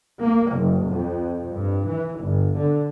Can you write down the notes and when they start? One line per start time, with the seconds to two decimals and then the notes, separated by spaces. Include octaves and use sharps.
0.19 A#3
0.51 F#1
0.89 F2
1.54 G2
1.87 E3
2.20 G1
2.57 D3